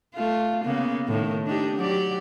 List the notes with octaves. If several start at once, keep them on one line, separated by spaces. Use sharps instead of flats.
A3 F4
C#3 A#3 B3
A2 D#3
D4 D#4 G4
F#3 G4 D5